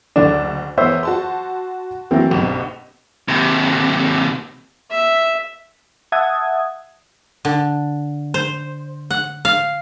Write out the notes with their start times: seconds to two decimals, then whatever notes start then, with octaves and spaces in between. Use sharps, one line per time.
0.16 F#1 D2 D4 E7
0.78 E2 B3 C5 C#5 E5
1.03 F#4 A5 C6
2.11 E3 F#3 A3 A#3 C4
2.31 F#1 B1 G2
3.28 D#2 C3
4.91 E5
6.12 E5 F#5 A5 D#6 G#6
7.45 D3
8.34 C5
9.11 F#5
9.45 F5